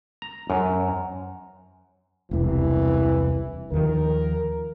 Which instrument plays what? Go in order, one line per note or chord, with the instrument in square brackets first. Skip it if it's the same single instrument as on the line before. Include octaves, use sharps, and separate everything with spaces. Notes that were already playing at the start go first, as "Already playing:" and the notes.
[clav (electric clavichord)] A#5
F#2
[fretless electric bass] E1 C2 C3 [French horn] E3
[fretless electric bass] D#2 D#3 F3 [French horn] A#4